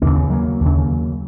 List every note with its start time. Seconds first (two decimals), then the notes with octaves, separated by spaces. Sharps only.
0.02 D#2 C#3 A#3
0.16 B3
0.30 F#3 A#3
0.61 D#2 C#3